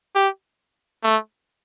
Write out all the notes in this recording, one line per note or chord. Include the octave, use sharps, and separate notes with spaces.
G4
A3